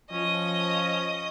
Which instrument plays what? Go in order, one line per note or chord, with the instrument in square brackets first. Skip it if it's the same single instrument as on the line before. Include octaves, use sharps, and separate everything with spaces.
[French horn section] F3 [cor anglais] C#4 [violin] D#5 D#6